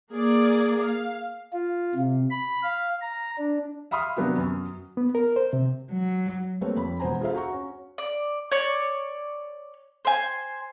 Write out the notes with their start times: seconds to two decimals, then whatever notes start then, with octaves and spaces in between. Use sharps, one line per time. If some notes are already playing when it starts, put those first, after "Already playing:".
0.11 A#3 G#4 D5
0.84 F5
1.53 F4
1.95 C3
2.31 B5
2.63 F5
3.01 A#5
3.38 D4
3.91 E5 F5 B5 C6 D#6 F6
4.17 C3 F#3 B3 D4 G4
4.38 F#2
4.97 B3
5.15 A#4
5.36 C5
5.53 C3
5.92 F#3
6.61 G3 A3 A#3 C4 B4 C#5
6.77 F2 B5
6.99 E1 B3 C5 G#5 A#5
7.21 F4 G#4 A4 C5 E5 F5
7.35 F#4 A#5 C#6
7.53 C#4
7.98 D5
8.52 C#5 D5
10.05 C5 G#5